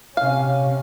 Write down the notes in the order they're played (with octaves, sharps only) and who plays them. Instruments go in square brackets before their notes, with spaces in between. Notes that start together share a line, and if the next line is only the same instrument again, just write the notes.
[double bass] C3 C#4 [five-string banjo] F5